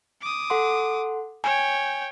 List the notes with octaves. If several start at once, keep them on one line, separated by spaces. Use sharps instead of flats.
D6 D#6
A4 F#5 C6
C#5 G5 G#5